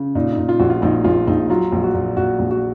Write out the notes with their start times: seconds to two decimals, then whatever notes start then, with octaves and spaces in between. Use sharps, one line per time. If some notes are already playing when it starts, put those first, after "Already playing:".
Already playing: C#3
0.15 A#2 D#4
0.32 D#4
0.38 A#2
0.49 F4
0.59 A#1 F#4
0.70 F4
0.82 A#1 D#4
1.04 A#1 F4
1.27 A#1 D#4
1.50 F#3 F4
1.72 A#1
1.84 F#4
1.94 A#2
2.17 A#2 F#4
2.39 A#1
2.51 F#4